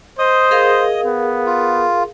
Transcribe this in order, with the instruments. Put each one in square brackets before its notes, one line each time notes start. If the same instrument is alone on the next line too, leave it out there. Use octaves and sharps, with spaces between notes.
[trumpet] C5 [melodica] D#5 D#6
[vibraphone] G#4 A#4 F5
[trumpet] B3
[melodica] F4